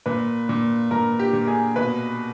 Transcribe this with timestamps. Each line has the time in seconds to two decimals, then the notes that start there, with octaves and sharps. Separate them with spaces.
0.06 A#2 B4
0.49 A#2
0.91 A#2 A#4
1.19 G4
1.33 A#2
1.47 G#4
1.76 B2 B4